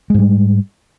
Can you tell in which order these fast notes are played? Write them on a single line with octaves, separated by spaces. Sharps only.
G#3 G#2 G3